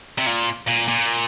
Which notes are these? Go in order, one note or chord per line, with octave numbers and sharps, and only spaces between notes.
C3
A#2
A#2
A#2